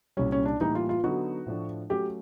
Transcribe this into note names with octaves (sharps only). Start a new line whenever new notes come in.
C2 A#2 G3 C#4
C#4
D4
A2 E3 G3 A#3 D#4
F4
F4
D3 F#3 B3 D#4 F#4
A2 F3 A3 D4
F#3 A3 C#4 F#4 G4